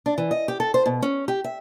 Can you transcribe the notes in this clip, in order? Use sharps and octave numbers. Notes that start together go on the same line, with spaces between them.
D4
E3
D#5
G4
A4
C5
B2
C#4
G4
E5